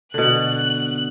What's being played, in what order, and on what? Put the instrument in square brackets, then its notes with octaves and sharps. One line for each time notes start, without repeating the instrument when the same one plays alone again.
[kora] B2 D3 [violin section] F#6